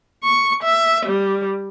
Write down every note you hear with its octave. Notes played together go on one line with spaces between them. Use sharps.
C#6
E5
G3